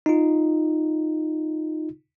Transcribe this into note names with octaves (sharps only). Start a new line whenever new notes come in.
D#4 F4